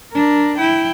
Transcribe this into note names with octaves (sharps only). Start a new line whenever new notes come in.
D4 A#4
E4 G5